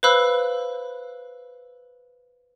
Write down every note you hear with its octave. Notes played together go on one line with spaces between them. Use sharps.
B4 C5 F5 B5 E6 F#6